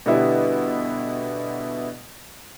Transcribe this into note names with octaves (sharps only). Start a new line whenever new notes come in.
B2 D3 G3 B3 D4 E4